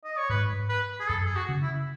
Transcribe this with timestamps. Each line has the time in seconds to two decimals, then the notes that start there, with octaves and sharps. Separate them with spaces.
0.04 D#5
0.17 C#5
0.30 G#2 B4
0.69 B4
1.00 G#4
1.09 F#2 A4
1.25 G#4
1.36 F#4
1.49 C#3
1.62 E4